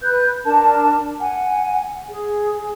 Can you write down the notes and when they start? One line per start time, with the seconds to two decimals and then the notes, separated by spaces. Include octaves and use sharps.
0.02 B4 F#6 G6
0.45 D4 A#4 A5
1.20 F#5 G#5
2.08 G#4